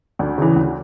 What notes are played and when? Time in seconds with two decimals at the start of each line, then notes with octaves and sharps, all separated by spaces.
0.19 D2 D4
0.38 C#3 E3
0.56 D2